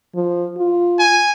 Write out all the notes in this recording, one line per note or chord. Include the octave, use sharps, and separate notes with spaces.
F3
F4
G#5